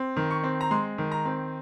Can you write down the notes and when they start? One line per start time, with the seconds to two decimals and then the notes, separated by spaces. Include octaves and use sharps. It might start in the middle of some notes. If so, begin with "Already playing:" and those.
Already playing: C4
0.17 D#3
0.31 C#6
0.44 C4
0.61 A#5
0.71 G#3 C6
0.98 D#3
1.12 A#5
1.25 C4